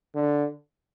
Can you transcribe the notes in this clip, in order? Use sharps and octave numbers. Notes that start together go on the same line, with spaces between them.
D3